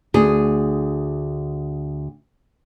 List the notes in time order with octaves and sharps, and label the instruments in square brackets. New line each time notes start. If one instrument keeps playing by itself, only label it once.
[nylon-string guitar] D2 G#4